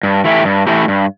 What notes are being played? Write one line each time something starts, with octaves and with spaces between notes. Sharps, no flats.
G2
E3 A3 E4 G4
G2
E3 A3 E4 G4
G2